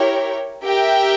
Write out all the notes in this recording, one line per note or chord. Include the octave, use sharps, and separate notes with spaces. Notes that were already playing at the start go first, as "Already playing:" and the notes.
Already playing: E4 G4 A#4 C#5 G5
G4 A#4 E5 G5